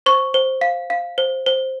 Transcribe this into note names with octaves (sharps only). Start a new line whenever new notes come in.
C5 C#6
C5
F5
F5
C5
C5